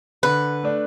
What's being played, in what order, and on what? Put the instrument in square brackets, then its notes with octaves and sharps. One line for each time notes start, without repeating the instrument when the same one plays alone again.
[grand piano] D3 [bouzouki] B4
[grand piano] A3 D4